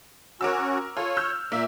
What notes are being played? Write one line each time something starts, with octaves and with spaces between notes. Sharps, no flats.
C#4 F#4 A#4 D6 E6
F4 A4 C#5
E6 F6 G6
A#2 A#3 E5